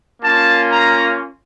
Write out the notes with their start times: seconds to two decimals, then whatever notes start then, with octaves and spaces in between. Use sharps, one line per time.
0.23 A#3 C#4 F4 A5
0.72 A#5